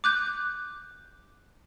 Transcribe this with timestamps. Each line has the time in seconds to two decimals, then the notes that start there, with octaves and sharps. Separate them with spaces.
0.04 D6 F#6 G6